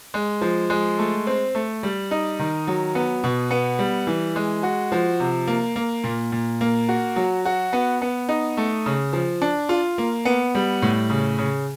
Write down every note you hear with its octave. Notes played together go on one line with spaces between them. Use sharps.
G#3
F3
G#3
A3
C4
A3
G3
D#4
D#3
F#3
B3
B2
B3
G3
E3
G#3
F#4
F3
C3
A#3
A#3
A#2
A#2
A#3
F#4
F#3
F#4
B3
B3
D#4
A3
C#3
F3
D4
F4
A#3
B3
G3
A2
C#3
C#3